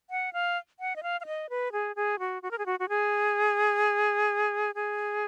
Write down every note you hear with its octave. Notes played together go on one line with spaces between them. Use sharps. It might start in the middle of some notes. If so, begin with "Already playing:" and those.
F#5
F5
F#5
D#5
F5
F5
D#5
B4
G#4
G#4
F#4
F#4
A#4
G#4
F#4
F#4
G#4
G#4